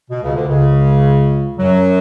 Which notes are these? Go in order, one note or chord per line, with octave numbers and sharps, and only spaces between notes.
B2
C#2 C#3
D2 D3
C#2 C#3
F#2 F#3